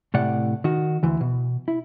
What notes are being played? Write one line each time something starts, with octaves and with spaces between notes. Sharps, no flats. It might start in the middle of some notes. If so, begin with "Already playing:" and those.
A2 C3 D5 F#5
D#3 F#4
D2 E3
B2
E4